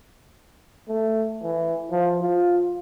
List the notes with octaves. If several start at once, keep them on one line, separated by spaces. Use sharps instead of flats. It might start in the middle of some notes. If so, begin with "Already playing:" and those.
A3
E3
F3
F4